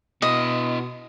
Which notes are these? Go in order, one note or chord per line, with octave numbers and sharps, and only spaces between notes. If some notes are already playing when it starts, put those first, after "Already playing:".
B2 E4 F#4 D#5